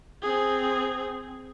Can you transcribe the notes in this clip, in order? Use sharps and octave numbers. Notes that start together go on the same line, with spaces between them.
C4 G#4